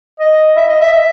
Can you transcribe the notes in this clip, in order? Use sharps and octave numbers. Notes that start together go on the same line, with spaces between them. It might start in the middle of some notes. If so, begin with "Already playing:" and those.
D#5
E5
D#5
E5
E5